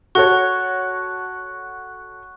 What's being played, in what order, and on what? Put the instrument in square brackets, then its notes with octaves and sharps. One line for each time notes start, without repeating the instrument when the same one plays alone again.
[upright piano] F#4 A4 C#5 [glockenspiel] C#6 F#6